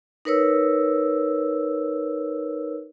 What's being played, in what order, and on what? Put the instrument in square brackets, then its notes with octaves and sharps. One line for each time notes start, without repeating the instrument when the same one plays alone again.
[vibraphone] D#4 A#4 B4 C#5 E6